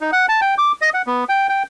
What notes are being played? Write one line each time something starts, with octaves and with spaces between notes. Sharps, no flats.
D#4
F#5
A5
G5
D6
D#5
F#5
B3
G5
G5